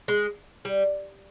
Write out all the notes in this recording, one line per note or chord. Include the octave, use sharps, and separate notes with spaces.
G#3
G3